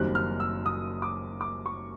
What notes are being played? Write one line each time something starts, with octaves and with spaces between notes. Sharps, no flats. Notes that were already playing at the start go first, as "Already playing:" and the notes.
Already playing: F#1 F#2 D#3 G3 C4 F#6
F6
E6
D#6
D6
D6
C#6